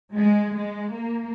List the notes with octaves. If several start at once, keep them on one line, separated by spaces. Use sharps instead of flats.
G#3
G#3
A#3